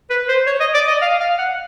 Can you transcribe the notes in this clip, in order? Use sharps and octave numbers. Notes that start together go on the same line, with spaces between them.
B4
C5
C#5
D#5
D5
D#5
F5
F5
F#5